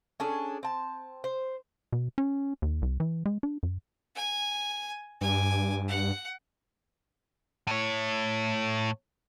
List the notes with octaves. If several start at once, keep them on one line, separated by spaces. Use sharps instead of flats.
C#4 D4 G#4 A4
C4 A5
C5
B2
C#4
D#2
C2
E3
G#3
D4
F#2
G#5
G2 G#5 D6
F#5
A2 C#5